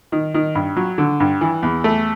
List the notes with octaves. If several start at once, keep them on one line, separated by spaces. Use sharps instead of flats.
D#3
D#3
G2
F#3
D3
G2
E3
E2
A3